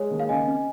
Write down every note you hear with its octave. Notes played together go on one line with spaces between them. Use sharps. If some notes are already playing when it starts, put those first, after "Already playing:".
Already playing: G#3 C#5
D#2
F5
C#3 D#5 G#5
C#4